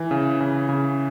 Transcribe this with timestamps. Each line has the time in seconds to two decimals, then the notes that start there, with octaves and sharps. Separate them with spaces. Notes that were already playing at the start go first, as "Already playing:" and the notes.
Already playing: E3
0.11 C#3
0.40 C#3
0.69 C#3